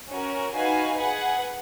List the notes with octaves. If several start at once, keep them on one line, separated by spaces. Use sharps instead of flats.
C#4 F#4 A#4
D#4 F#4 B4 F5 G#5
G#4 B4 F#5